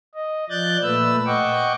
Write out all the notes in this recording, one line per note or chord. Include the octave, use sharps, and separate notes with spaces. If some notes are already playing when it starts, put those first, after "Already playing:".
D#5
F3 D5 F#6 G6 A6
A#2 A3 B4 E6
D#5 F#5 G5 C#6 D6